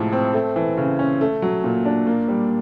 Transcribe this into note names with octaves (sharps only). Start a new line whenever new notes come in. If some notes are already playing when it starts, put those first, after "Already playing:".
Already playing: A2 C3 F3 G#3
C4
A3
E3
C#3
C#4
A3
F#3
A#2
D4
A#3
G3